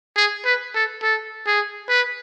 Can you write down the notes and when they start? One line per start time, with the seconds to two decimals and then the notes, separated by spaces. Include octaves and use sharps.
0.16 G#4
0.45 B4
0.75 A4
1.02 A4
1.47 G#4
1.89 B4